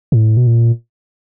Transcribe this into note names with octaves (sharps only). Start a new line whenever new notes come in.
A2
B2
A#2